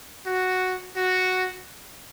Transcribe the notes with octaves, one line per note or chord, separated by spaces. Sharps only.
F#4
F#4